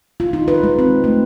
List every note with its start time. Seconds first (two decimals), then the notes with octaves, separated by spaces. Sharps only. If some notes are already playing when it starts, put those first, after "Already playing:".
0.20 F4
0.33 D#4
0.48 B4
0.63 G#3
0.79 C4
1.04 A3